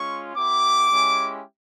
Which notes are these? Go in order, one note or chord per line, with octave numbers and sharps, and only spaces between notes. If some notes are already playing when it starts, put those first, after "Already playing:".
Already playing: G#3 C#4 F4 C#6
B3 E4 G4 D6
G#3 C#4 E4 G4